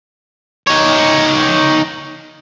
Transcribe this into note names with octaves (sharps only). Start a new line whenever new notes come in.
D#4 C#5